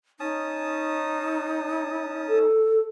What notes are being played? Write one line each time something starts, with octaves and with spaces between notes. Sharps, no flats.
C#4 D#4 A5 D#6
A4